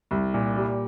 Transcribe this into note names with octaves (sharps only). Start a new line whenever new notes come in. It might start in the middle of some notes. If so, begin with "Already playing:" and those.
C2
A#2
G3